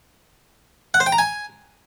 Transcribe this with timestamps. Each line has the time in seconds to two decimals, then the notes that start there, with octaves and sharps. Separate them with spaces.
0.94 F#5
1.00 C5
1.06 G5
1.12 A#5
1.18 G#5